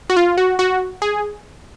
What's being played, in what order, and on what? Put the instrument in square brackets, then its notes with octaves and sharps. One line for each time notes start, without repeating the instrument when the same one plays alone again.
[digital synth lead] F#4
F4
F#4
F#4
G#4